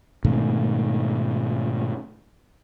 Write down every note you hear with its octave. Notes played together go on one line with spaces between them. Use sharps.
G#2 B2 D#3 A3